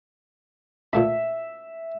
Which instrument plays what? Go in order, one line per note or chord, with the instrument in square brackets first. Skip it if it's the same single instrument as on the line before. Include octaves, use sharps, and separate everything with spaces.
[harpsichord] A#2 A3 B5 [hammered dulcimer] E5